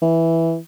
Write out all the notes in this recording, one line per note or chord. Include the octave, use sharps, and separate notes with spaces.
E3